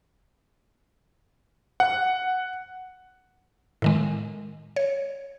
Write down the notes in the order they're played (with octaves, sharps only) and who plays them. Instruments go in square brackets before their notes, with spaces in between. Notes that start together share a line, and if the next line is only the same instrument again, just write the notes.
[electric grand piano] F#5
[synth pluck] A2 D#3 G#3
C#5